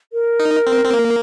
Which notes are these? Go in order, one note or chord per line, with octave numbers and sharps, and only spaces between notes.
A#4
D#4
C4
C4
A#3